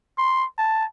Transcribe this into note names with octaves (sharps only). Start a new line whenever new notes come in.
C6
A5